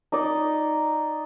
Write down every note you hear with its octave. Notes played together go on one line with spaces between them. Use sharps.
D#4 D5 D#5